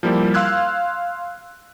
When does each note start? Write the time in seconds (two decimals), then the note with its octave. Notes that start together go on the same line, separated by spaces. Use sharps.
0.03 F3 G3 A#3 E4 G4
0.34 F5 C6 E6 F#6 G#6